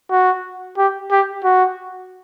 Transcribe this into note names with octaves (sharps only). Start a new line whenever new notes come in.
F#4
G4
G4
F#4